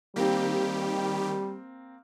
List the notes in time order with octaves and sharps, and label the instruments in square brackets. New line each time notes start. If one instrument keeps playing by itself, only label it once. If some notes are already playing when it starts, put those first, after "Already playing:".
[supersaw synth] D#3 G4 [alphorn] G3 [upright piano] A#3 C4